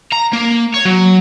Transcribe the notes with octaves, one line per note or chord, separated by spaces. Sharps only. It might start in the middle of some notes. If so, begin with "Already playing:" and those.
A#5
A#3
C#5
F#3